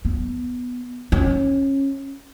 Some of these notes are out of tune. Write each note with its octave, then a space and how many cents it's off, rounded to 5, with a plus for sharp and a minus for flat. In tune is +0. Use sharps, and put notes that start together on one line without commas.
B3 +0
C#4 -20